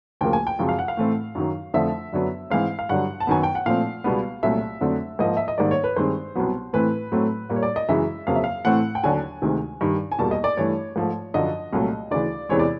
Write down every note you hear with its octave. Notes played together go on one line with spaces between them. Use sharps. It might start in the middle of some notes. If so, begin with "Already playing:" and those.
D2 C#3 F3 A#3 G5
G#5
G5
F#2 C#3 F3 G#3 C4
F5
F#5
F5
A2 E3 A3 C4
F#2 D#3 F#3
F2 D3 F3 A3 E5
F#2 D3 F#3 B3
G#2 E3 G#3 C4 F5
F5
G2 D3 F#3 F#5
A5
F#2 D#3 F#3 B3 G#5
G5
F#5
A#2 F3 A3 C4 F5
C#2 B2 G3 B3
C2 A#2 F#3 A3 E5
F2 D3 F#3 A3 C4
G#2 F3 A#3 D#5
E5
D#5
G#2 D#3 G3 A#3 D5
C#5
B4
G2 D#3 G#3 C4 C5
C2 B2 F#3 B3
A2 E3 A3 C4 B4
A2 F#3 A3 C4
A#2 G3 A#3
C#5
D5
D#5
F#2 C#3 E3 G#3 E5
F2 C#3 F#3 A#3 F5
E5
F5
A2 E3 A3 C4 F#5
G5
D#2 D3 F#3 G#5
D2 C3 D#3 G#3
G2 D#3 G3
G#5
E2 B2 G3 A#3 A5
D#5
D5
G2 E3 A3 C#5
G#2 F3 A3
F#2 D3 F3 D#5
C2 A#2 F#3 A3
D2 C#3 E3 D5
E2 C3 E3 G#3 C4 C#5
D5